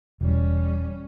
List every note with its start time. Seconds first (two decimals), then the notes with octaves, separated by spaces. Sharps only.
0.21 E1 G3 C#4